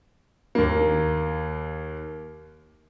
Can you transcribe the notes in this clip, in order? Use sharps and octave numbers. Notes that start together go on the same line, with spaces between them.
D#2 A#3